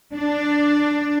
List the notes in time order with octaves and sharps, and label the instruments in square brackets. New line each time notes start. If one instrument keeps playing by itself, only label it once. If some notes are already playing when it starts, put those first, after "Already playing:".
[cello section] D4